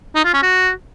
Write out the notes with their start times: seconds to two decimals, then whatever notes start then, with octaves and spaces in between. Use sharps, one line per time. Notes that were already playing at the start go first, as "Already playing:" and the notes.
0.16 D#4
0.25 F4
0.34 C#4
0.43 F#4